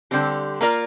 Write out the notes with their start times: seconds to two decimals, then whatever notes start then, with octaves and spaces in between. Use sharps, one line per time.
0.11 D3 G3 C4 G4
0.61 A#3 F4 A#4 D5